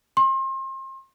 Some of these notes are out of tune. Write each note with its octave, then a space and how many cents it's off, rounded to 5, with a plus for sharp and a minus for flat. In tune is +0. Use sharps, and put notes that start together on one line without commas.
C6 +35